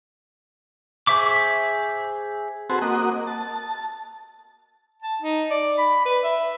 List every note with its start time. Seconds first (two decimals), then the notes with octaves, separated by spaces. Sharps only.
1.07 G#4 C5 E5 C#6 D6
2.70 C4 F#4 G#4 A4 B4 C5
2.82 A#3 F#4 D#5
3.27 A5
5.02 A5
5.22 D#4
5.51 D5
5.78 B5
6.06 B4
6.24 E5